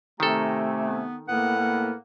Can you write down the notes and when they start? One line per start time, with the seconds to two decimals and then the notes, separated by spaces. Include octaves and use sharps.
0.20 C3 D#3 A3 G4 A4 G#5 A#5
0.85 B3
1.29 A2 A#3 B3 F#5
1.58 A#3